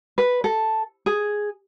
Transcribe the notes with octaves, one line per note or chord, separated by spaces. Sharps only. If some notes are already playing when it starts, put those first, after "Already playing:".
B4
A4
G#4